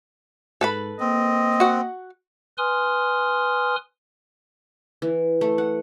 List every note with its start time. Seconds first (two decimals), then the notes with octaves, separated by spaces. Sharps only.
0.61 G#2 A4 B4 B5
1.00 A#3 C4 D#5
1.60 F#4 F#5
2.58 B4 G#5 C6 D#6 F6
5.02 E3
5.41 A3
5.58 F#5